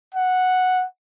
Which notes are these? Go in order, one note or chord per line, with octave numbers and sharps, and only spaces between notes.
F#5